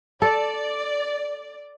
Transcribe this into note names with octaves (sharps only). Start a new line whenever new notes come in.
A4 D5